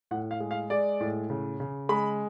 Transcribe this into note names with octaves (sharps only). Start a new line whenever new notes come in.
A2 F#5
F5
G#3
F5
G#3 D5
A2
C#3
C#3
G#3 B5